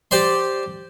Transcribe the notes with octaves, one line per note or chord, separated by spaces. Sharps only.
G4 C5 D5 C6